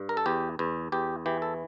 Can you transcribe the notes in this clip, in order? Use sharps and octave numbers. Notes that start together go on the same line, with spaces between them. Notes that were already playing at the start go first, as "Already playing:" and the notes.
Already playing: G2
A#4
A4
E2 G4
E2
E2 G4
E3 G4
A4